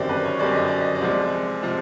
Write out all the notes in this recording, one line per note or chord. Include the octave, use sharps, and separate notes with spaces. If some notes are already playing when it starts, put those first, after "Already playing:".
Already playing: G1 F#2 D#3 G3 C4 D5
B4
C#5
G1 F#2 D#3 G3 C4 D5
D#5
D5
D#5
D5
C2 C3 F3 G#3
C3 F3 G#3